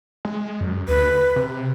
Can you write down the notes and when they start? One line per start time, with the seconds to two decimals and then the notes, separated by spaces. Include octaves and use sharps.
0.25 G#3
0.61 F#2
0.88 D2 B4
1.36 C3